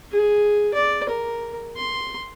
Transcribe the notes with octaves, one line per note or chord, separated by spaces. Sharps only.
G#4
D5
A#4
C6